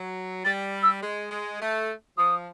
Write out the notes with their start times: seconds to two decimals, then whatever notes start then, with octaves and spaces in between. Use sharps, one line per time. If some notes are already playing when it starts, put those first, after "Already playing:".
Already playing: F#3
0.45 G3 A6
0.83 E6
1.03 G#3
1.31 G#3
1.61 A3
2.18 F3 D#6